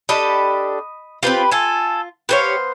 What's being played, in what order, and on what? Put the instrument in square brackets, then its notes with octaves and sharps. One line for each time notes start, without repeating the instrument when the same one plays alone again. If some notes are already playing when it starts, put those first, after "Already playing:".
[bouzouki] D4 G4 A4 [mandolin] D#5 B5
[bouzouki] C4 F4 [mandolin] G4 B4 B5
[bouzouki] F4 [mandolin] A4 G#5
[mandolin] B3 C5 F5 [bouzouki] G4 G#4 C#5